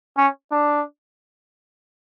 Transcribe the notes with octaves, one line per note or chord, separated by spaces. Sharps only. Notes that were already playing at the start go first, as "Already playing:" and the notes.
C#4
D4